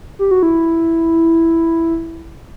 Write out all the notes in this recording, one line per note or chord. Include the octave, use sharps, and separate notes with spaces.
G4
F#4
E4